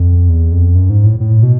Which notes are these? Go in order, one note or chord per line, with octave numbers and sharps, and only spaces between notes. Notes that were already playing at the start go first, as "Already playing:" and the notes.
Already playing: F2
E2
F2
F#2
G#2
A2
A2
B2